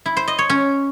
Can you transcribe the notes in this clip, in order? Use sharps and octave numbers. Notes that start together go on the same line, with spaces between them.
E4
C5
D#5
C#5
C#4